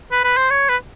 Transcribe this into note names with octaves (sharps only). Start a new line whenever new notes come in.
B4
B4
C5
C#5
B4